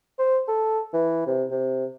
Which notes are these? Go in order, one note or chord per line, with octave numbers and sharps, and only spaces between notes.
C5
A4
E3
C3
C3